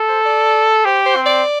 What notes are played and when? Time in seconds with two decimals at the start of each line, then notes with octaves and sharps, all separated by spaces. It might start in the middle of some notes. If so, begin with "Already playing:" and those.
Already playing: A4
0.09 C5
0.25 D5
0.85 G4 C5
1.06 C5
1.16 C4
1.26 D5